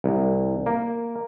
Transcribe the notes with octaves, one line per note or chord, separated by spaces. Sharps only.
C2
A#3